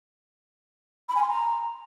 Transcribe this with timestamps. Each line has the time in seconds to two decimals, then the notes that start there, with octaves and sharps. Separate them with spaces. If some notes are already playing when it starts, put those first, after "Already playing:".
1.09 B5
1.15 G#5
1.22 C6
1.28 A#5